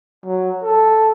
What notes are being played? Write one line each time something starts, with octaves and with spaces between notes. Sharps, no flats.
F#3
A4